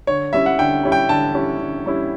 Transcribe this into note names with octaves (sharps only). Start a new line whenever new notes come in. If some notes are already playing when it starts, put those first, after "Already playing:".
D3 C#5
G3 C#4 E4 E5
F#5
D3 G5
G3 C#4 E4
G5
D3 A5
G3 C#4 E4
D3
G3 C#4 E4